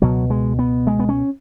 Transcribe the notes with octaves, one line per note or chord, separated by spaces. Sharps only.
C#2 B2 F#3
G#3
B3
G#3
B3
C#4